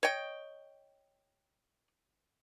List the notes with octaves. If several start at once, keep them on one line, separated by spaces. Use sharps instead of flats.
C#5 D#5 G5